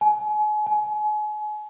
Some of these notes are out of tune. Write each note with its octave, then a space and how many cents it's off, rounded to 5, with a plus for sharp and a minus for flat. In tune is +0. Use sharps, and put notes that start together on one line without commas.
G#5 +35
G#5 +35